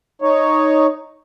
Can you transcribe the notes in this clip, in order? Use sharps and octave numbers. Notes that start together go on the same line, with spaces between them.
D#4 C#5